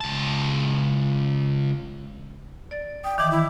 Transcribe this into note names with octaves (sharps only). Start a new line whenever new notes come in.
C#2 A5
D5 A6
G5 D#6
D#3 E3 D6
E4